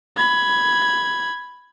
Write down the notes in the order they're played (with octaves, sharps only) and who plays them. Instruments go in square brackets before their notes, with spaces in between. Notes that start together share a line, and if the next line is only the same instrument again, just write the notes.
[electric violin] B5 G#6